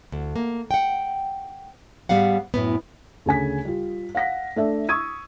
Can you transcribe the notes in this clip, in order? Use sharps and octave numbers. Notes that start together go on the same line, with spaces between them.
D2
A#3
F#5 G5
G#2 G3 B3 F5 F#5
F#2 A2 B3
D2 C#3 G#5 B6
G3 F4
F5 F#5 A#6 B6
A3 D4 E5
C#6 D#6 E6 G#6 D#7